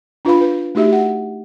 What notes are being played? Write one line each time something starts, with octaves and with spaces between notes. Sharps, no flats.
D4 F4 B4 F5 B5
B4
A3 D#4 F#4 G4 E5
F#5